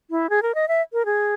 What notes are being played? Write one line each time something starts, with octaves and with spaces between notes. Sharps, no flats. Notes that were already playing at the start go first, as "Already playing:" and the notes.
E4
G#4
A#4
D#5
E5
A#4
G#4